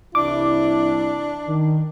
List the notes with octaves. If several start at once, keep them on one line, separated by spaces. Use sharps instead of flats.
C2 E3 D4 E4 D6
D#3